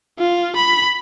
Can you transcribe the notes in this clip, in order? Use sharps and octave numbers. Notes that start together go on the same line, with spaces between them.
F4
B5